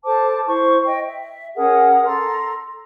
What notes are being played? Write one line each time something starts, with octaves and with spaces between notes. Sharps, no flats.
A4 C5 A5 D6
E4 C5 C#6
D#5 G5
E5
C#4 G#4 A#4 F#5
A4 A#5 C6